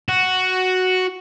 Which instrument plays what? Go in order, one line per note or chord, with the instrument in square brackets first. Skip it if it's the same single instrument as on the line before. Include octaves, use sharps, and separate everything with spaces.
[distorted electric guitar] F#4